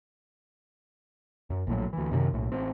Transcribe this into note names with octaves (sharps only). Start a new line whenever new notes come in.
F#2
A#1 A2 F#3
D2 E3
F#2 C3 D#3
B1 A2
A1 C4